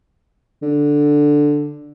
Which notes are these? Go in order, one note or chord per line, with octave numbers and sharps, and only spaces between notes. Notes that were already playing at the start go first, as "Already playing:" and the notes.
D3